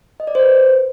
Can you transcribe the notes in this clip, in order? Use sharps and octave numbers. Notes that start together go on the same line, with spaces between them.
D#5
D5
C5
B4